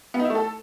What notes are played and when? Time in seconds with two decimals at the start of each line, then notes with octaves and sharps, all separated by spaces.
0.14 B3
0.19 D#4
0.25 E4
0.30 A3
0.35 A4